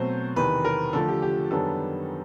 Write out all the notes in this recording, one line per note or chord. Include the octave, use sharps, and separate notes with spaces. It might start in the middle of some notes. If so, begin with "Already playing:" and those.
Already playing: B2 F#3 A3 C4 C5
E2 C3 D#3 B4
A#4
D3 F3 A3 A4
G4
G4
F#2 D#3 G3 B3 D4 A4